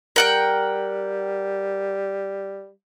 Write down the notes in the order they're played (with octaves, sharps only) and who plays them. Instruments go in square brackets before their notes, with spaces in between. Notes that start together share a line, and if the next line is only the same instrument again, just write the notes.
[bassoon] G3 [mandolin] A#4 F#5 G5